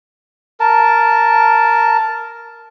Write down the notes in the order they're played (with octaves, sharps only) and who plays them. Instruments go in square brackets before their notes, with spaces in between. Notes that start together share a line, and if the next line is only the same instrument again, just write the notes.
[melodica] A#4 A5